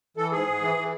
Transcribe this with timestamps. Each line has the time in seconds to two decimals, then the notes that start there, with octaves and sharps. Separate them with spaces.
0.17 E3 A4
0.32 G#2 G#4
0.47 G#2
0.62 E3
0.77 E3